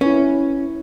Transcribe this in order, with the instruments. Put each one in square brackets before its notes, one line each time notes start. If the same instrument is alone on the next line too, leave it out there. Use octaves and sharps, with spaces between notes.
[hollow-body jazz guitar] C#4 [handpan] E4 B4